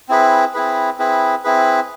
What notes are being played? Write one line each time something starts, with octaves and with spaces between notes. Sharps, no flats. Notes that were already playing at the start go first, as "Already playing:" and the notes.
C4 E4 G#4 B4
C4 E4 G#4 B4
C4 E4 G#4 B4
C4 E4 G#4 B4